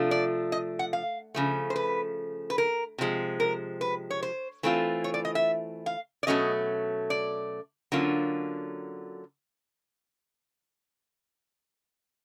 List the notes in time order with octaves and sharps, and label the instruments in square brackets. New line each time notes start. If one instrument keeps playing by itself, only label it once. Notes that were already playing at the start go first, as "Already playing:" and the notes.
Already playing: [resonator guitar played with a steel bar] C3 F3 A3 D4 F4
D5
D#5
F#5
F5
C#3 F3 A3
C5
B4
B4
A#4
C3 F3 G#3
A#4
B4
C#5
C5
E3 A3 C4 F4
C#5
D5
D#5
E5
F5
D5
B2 F#3 A3 C#4 D#5
D5
D3 F#3 A#3 C#4 F4